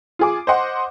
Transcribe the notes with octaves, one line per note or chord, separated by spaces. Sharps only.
F4 G#4 D6
C5 D#5 F#5 C6